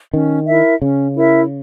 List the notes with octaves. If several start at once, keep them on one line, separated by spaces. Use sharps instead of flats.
D#3 C#4
E4 A#4 E5
C#3 C#4
E4 A#4 E5